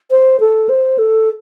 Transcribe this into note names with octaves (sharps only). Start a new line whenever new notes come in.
C5
A4
C5
A4